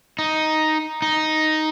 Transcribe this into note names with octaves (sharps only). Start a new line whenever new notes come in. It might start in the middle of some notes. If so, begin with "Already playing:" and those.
D#4
D#4